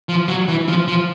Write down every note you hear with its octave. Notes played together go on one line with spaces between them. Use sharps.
F3
F#3
E3
F3
F3